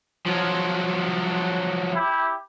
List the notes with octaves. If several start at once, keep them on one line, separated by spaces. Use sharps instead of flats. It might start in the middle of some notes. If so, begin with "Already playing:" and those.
F3 F#3
E4 G4